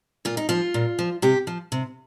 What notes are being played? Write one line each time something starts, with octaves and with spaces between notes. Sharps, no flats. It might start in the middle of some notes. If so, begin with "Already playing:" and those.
A#2 F4
D#4
F3 F4
A#2
F3
C3 G4
F3
C3